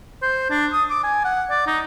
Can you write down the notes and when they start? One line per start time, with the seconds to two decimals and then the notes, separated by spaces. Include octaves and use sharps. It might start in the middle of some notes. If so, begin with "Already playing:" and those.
0.22 C5
0.50 D4
0.72 D#6
0.90 D6
1.03 G#5
1.24 F#5
1.50 D5
1.67 D#4